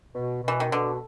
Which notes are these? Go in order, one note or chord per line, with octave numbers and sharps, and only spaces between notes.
B2
B2
E3
D#3
B2 D3